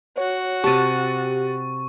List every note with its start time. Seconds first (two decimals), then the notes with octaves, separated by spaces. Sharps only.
0.18 F#4 C#5
0.64 C3 G4 A5 C#6 A6